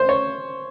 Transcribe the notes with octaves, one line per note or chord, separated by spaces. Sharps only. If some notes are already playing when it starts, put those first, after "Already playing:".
Already playing: C5
C#5